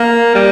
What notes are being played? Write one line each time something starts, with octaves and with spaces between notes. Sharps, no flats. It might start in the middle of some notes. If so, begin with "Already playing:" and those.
Already playing: A#3
G3